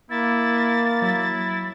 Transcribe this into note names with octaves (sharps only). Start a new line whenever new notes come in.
A#3 E4 A6
F#3 E4